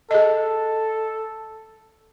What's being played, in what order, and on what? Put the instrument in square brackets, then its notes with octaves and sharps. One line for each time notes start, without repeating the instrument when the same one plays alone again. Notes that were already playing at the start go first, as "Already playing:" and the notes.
[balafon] G#4 D#5 [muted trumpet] A4